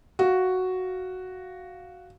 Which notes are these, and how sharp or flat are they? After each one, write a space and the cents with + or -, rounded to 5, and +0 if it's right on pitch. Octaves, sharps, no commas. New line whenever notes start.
F#4 +0 F5 +0